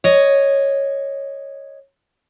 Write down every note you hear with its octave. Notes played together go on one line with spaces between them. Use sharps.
C#5 D#5